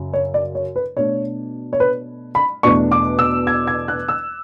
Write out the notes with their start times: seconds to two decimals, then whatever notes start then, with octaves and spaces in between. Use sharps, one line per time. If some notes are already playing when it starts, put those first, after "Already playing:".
Already playing: F#2 C#3 F#3
0.13 C#5
0.34 D5
0.55 C#5
0.76 B4
0.97 B2 A3 D4 C#5
1.73 C#5
1.80 B4
2.35 B5
2.63 E2 B2 A3 D4 C#6
2.92 D6
3.19 E6
3.47 G#6
3.67 G#6
3.88 F#6
4.08 E6